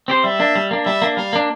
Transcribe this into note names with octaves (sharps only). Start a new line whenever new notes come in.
C4 G4 C5
G3 E5
A#3 D4
G3
A#3 D4
G3 E5
A#3 D4
G3 F5
A#3 D4